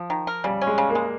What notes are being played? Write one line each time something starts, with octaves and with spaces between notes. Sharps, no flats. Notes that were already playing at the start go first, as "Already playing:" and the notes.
Already playing: F3
D#3
A#4
C#3 G3
C#4
G#3
C#3
A#3
G#3